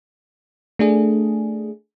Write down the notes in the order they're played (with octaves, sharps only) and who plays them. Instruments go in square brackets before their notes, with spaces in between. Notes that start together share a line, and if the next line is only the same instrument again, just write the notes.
[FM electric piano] A3 D4 G#4